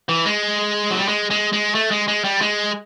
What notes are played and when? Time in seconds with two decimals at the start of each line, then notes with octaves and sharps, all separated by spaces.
0.09 E3
0.26 G#3
0.91 F#3
0.99 G3
1.08 G#3
1.30 G#3
1.53 G#3
1.75 A3
1.91 G#3
2.08 G#3
2.24 G3
2.41 G#3